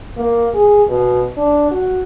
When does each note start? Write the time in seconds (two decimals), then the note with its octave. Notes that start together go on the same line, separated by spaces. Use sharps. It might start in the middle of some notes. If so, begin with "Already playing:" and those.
0.17 A#3
0.54 G#4
0.89 B2
1.37 D4
1.72 F#4